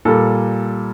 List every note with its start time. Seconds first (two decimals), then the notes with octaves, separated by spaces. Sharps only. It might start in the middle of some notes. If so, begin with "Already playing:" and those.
0.05 A#2 G3 A4